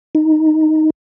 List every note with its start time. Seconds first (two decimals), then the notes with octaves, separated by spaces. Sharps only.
0.15 D#4